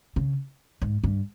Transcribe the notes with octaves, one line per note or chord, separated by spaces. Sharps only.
C#3
G#2
G2